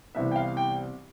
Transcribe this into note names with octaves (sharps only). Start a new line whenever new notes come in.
C2 C3 E3 B3 E5
G5
F5
G5